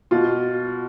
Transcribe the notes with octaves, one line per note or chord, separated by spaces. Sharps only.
B2 F4